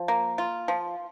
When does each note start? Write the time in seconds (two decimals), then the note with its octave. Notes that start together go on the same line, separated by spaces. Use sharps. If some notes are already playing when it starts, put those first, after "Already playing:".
Already playing: F3
0.08 A#3
0.38 F4
0.68 F3